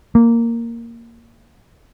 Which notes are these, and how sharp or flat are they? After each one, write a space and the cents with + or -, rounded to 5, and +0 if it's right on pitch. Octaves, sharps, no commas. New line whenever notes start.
A#3 -5